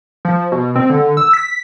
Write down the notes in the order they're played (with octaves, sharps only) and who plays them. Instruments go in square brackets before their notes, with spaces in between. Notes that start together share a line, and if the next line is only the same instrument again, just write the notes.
[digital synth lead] F3
B2
C4
D3
E6
B6